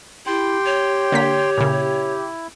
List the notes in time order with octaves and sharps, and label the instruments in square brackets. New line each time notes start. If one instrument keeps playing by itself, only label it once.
[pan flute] E4 [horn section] G4 [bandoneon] G5 C6
[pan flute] C#5
[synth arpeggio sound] D3 A#3 B6
[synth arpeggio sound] A#2 C#3 [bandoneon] E4